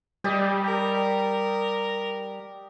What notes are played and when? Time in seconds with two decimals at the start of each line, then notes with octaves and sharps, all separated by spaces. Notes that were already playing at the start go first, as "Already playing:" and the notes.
0.24 G3 G4 D5 D#5
0.65 A#4